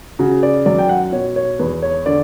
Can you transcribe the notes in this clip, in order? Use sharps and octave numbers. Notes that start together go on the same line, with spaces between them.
C#3 F#4
D5
F#2 D5
G5
F#5
B2 C#5
C#5
E2 B4
C#5
D3 D5